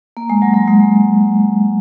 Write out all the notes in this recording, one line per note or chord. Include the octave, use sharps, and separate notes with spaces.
A#3
G#3
F#3
F#3
G#3